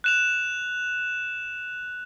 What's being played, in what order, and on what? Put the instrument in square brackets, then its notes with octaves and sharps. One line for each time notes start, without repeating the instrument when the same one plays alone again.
[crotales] F#6 E7 F7